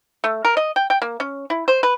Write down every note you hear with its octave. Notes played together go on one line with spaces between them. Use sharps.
A3
A#4
D#5
G5
G5
A#3
C#4
E4
C5
B4